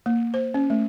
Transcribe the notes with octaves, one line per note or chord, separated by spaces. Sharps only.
A#3
C5
C#4
A3